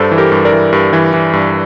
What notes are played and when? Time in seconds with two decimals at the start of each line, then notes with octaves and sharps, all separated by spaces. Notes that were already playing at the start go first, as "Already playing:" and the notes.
Already playing: G2 A4 C5
0.11 E3
0.18 G4 A#4
0.32 G2
0.45 A#4 D5
0.52 E3
0.73 G2
0.93 E3
1.13 E3
1.33 G2